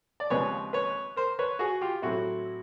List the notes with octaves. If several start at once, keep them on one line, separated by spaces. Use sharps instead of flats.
D5
D#2 C#3 F3 G#3 C4 B4 C#5
B4 C#5
A#4 C5
B4 C#5
F#4 G#4
F4 G4
A2 F#3 A3 C4 E4 F#4